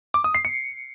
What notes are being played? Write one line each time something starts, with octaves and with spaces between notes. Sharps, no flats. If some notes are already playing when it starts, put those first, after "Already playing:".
D6
D#6
C7
C#7